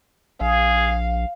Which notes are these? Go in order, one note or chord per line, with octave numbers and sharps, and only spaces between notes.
A#1 G#4 F5